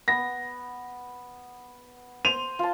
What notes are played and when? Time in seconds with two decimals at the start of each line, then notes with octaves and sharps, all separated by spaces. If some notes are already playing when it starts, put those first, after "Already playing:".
0.08 B3 A#6
2.25 C5 D#7 F7
2.59 F4 A5